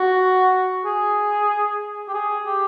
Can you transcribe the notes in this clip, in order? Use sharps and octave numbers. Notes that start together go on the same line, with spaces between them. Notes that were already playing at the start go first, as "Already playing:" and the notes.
Already playing: F#4
G#4
G4
G#4
G4